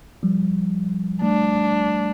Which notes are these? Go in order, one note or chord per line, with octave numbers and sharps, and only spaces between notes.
F3 G3
G3 A3 D4